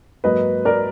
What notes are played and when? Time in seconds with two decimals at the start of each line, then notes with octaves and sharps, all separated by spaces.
0.24 G#2 F#3 A#3 B4 D#5
0.65 A#4 D5